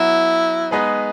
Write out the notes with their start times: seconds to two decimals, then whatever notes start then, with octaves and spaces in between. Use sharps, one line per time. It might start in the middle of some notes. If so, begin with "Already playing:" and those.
Already playing: F#3 B3 E4 F#4
0.71 G#3 B3 D#4 G#4 B4